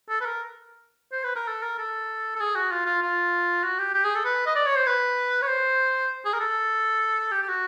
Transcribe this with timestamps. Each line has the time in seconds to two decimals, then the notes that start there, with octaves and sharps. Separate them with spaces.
0.09 A4
0.21 B4
0.26 A#4
1.12 C5
1.24 B4
1.36 A#4
1.48 A4
1.63 A#4
1.78 A4
2.36 A4
2.40 G#4
2.55 F#4
2.72 F4
2.86 F4
3.02 F4
3.64 F#4
3.79 G4
3.94 G4
4.05 G#4
4.15 A4
4.25 B4
4.46 D#5
4.56 D5
4.66 C#5
4.76 C5
4.86 B4
5.42 C#5
5.48 C5
6.25 G#4
6.34 A#4
6.40 A4
7.32 G4
7.42 G4
7.48 F#4